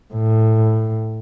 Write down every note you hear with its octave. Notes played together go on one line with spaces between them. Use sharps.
A2